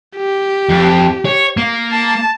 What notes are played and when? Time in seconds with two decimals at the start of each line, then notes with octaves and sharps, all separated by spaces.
0.17 G4
0.69 F2
1.25 C#5
1.57 A#3
1.92 A5